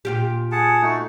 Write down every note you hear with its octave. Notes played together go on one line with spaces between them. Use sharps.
A#2 F4 G4
G#4 F#5 A5
A3 D#4 F#4